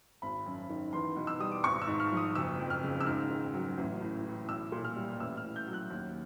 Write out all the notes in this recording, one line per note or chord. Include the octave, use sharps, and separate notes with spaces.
G#1 B5
F#2
D#3
E2 C6
B2
E6
G3 D#6
D6
G#1 C#6
E6
G#2
F6
F3 D#6
F#1 E6
F2
F6
C#3
E6
G#2 F6
D#3
F#3
A1
A2
E3
B1 E6
A#2
F6
G3
A1 E6
F6
A2
G6
F#3
F#6
D#2